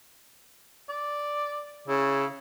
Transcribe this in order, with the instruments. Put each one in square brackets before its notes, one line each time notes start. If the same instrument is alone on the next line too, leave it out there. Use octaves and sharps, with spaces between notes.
[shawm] D5
[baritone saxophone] C#3 [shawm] E4